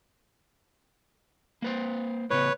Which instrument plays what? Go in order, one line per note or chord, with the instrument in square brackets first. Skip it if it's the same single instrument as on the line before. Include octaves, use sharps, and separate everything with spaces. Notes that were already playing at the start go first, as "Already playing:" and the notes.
[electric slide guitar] A#3 B4 C5
[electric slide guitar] A2 C#3 B3 [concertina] B4 C#5